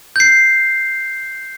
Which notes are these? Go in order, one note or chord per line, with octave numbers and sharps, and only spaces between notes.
G6 C7